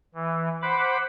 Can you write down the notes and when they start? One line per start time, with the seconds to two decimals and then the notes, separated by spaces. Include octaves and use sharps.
0.15 E3
0.62 C5 F#5 B5 D6